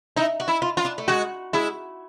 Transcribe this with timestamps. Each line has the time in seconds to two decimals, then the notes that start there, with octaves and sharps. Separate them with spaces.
0.16 D#4 E4
0.40 F#4
0.48 E4
0.62 F4
0.77 F4
0.85 D4
0.98 A3
1.08 G#3 F#4
1.53 G#3 E4